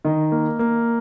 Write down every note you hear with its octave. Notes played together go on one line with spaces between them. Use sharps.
D#3 D#5
A#3
A#3